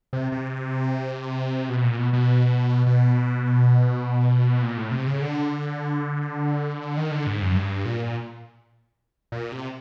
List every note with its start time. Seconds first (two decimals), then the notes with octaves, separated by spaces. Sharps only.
0.13 C3
0.32 C3
1.69 B2
1.84 A#2
1.98 B2
2.13 B2
2.87 B2
4.62 A#2
4.77 A2
4.91 C3
5.07 C#3
5.22 D3
6.97 D#3
7.11 D3
7.27 G#2
7.42 F#2
7.56 G2
7.85 A#2
9.32 A#2
9.52 C3